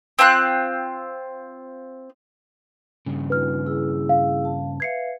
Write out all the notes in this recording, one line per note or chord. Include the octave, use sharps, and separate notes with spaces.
C4 F4 G5 F#6
G2 C#3
D#4 F4 B4 F6
E4 G#4 E6
F5
A5
B4 E5 F5 G#6 C7 C#7